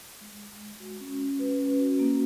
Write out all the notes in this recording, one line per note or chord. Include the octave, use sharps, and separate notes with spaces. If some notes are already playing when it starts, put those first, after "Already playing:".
G#3
G#3
G#3
F#4
C#4
C#4
B4
C#4
F#4
A#3